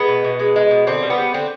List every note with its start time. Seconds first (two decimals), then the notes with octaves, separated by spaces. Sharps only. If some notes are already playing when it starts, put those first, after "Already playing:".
Already playing: G#3 B3
0.08 B2
0.24 B2
0.39 G#3
0.56 G#3
0.71 B2
0.87 D3 C4
1.02 G3
1.10 B3
1.18 G3
1.34 D3 C4